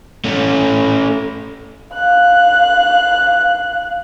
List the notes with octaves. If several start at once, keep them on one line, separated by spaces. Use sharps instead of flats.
A3 C#4
F5 F#6